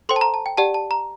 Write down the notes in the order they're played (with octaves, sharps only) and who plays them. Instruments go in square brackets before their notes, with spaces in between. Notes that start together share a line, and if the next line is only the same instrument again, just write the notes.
[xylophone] A4 C5 G5 C6
A5
A#5
A5
G5
G4 D5 F#5 A5
A5
A#5